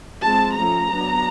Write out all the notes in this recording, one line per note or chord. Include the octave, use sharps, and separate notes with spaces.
F3 G#3 C4 A5
F3 A3 C#4 A#5
F#3 B3 D4